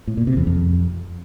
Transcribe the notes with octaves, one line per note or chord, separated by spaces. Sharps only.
A2
A#2
C3
E2
F2